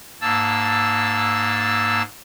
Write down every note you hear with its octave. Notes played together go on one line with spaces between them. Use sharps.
G#2 A#3 A5 E6 A6